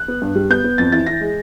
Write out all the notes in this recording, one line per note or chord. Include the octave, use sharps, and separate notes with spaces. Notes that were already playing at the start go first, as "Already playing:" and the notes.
Already playing: F#6
B3
G2
G3
B3 G6
B3
F2 A6
E3 A6
E3 A#6
G#3